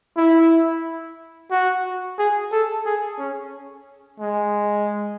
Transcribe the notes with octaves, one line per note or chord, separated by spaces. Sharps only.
E4
F#4
G#4
A4
G#4
C#4
G#3